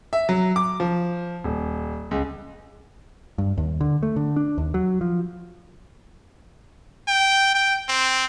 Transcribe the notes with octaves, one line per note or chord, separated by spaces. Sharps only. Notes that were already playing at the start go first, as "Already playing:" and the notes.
E5
F#3
D6
F3
D#1
C#2
G2
D#2
D3
A3
D3
D4
D#2
F#3
F3
G5
G5
C4